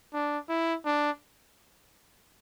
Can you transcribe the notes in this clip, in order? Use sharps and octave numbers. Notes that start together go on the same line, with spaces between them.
D4
E4
D4